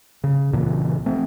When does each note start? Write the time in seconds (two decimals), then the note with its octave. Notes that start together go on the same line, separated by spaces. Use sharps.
0.24 C#3
0.52 C2 A#2 C#3 E3
1.06 F3 A3 C4